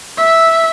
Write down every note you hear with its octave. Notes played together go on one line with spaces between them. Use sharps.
E5